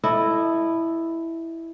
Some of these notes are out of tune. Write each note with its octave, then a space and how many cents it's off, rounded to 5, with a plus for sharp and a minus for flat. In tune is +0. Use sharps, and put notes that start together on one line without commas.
E4 +0 A4 +0 D#5 -20